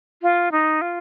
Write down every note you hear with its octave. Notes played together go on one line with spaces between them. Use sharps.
F4
D#4
F4